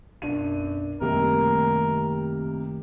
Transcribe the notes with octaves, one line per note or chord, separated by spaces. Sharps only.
B1 F#2 D4 D#7
F#2 C3 D#3 G3 A3 A#3 A#4